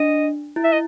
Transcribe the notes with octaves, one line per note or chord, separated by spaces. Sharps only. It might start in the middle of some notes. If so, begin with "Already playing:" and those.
Already playing: D4 D#5
E4
E5
D#5